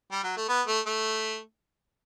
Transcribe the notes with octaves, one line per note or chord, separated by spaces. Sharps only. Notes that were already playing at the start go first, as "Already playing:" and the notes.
G3
F#3
A3
B3
A3
A3